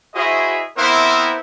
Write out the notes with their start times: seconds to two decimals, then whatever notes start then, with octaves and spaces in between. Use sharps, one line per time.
0.15 E4 F#4 G#4 C5 D#5 E5
0.78 B3 C4 E4 A#4 C5 E5